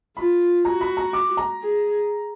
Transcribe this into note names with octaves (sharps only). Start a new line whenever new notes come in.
F4 B5
F#4 A#5
B5
A#5
D6
A#5
G#4